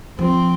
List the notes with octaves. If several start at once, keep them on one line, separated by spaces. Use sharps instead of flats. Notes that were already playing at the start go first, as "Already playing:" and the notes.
F3 C4